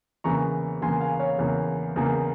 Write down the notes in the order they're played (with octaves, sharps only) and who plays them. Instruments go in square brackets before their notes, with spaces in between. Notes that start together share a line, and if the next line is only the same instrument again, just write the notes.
[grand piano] E2 C#3 E3 A#3 A#5 C#6
E2 C#3 E3 A#3 G#5 C6
F5 G#5
C#5 F5
E2 C#3 E3 A#3
E2 C#3 E3 A#3